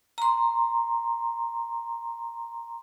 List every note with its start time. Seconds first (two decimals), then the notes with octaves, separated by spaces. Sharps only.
0.18 A#5 C6